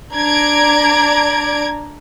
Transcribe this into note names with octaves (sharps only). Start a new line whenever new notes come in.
D4 D5 A#5 G#6 D7